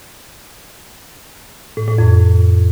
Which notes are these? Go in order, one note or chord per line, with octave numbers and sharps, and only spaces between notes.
A2
A2
F2